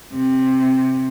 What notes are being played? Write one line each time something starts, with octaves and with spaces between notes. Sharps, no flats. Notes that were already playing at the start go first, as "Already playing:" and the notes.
C3